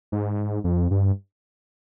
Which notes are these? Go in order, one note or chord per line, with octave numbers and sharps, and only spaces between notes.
G#2
F2
G2